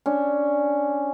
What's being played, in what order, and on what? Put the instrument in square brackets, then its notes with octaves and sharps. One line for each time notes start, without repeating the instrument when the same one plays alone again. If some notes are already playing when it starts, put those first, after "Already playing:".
[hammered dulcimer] C#4 D4